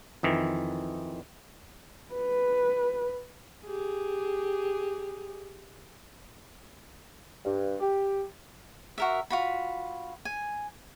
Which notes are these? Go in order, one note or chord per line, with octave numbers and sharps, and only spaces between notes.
F2 D#3 E3
B4
G4 G#4
G2
G4
F#4 A#4 E5
F4 F#4 B5
G#5